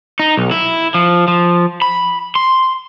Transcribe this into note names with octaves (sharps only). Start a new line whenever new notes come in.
D#4
B1
E4
F3
F3
B5
C6